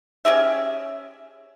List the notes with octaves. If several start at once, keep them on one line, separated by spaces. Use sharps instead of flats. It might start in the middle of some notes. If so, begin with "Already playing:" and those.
C#4 G4 G#4 E5